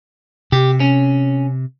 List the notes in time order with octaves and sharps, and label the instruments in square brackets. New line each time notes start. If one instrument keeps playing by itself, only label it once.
[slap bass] C3 [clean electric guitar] G4
[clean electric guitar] C#4